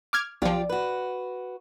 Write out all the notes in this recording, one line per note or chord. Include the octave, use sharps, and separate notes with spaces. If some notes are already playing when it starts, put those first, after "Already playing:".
D6 F6 G#6
B1 F3 F4 G4 D5
F#4 B4